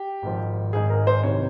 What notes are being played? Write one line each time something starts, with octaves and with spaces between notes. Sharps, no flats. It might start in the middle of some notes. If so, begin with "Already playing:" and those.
Already playing: G4
G#1 G#2 F3
G#1 G#2 D#3 G#4
A#4
C5
C2 C3 D#3 C#5